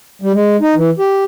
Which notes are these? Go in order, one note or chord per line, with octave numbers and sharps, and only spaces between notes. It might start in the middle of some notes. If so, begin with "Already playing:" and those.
G3
G#3
D#4
E3
G4